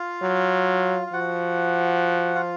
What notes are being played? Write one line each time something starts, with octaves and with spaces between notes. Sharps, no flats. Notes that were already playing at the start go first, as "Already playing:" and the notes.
Already playing: F4 F5
F#3
F5
F3 F#4 F#5
F4 F5